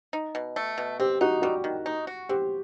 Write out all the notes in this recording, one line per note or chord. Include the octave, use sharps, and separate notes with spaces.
D#4
B2
A3
B2
C4 G4
D#4 F#4
G3 F#4
D#3
D#4
F#4
C4 G4